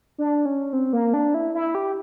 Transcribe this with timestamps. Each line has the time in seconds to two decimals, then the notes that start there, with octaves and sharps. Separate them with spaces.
0.18 D4
0.46 C#4
0.73 C4
0.93 A#3
1.14 D4
1.34 E4
1.55 E4
1.75 G4